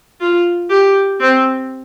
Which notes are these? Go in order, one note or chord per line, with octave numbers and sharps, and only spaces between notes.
F4
G4
C4